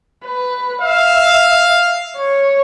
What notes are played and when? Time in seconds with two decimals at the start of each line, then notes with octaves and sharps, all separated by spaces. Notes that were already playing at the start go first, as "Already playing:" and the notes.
0.24 B4
0.81 E5 F5
2.17 C#5